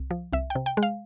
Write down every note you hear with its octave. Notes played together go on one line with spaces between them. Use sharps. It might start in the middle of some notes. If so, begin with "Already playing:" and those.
Already playing: C2
F3
C2 E5
G5
C3
G5
G#3
F5